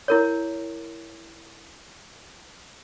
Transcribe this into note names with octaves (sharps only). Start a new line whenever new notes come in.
E4 A#4 C#5